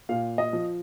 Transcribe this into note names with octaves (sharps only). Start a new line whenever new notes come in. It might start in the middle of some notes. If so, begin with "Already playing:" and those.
A#2 F5
D#5
F3